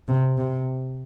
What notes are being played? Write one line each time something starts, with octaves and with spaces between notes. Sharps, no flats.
C3
C3